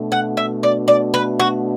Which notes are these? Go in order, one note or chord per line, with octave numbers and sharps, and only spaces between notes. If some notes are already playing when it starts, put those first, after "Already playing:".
Already playing: B2 A3 D4
F#5
E5
D5
D5
B4
F#4